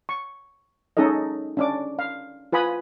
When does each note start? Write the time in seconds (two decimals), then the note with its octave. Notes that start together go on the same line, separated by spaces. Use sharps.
0.09 C#6
0.97 C#4 D#4 G#4 A4 D#5
1.57 C#4 D4 D6
1.99 F5
2.52 F4 B4 G#5 B5 D#6